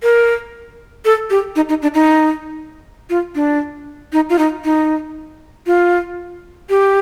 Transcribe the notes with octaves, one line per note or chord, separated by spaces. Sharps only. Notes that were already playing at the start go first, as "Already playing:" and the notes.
A#4
A4
G4
D#4
D#4
D4
D#4
F4
D4
D#4
F4
D#4
D#4
F4
G4